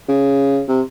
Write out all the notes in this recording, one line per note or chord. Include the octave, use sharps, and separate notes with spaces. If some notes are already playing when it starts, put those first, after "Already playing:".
C#3
C3